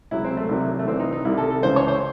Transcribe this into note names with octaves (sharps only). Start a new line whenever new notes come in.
C#2 C3 F#3 E4
C4
A3
C2 C3 D#3 F#3
A3
C2 C3 E3 C4
D#4
D#4
C2 C3 D#3 E4
A4
A4
C#2 C#3 E3 C5
C#5
C5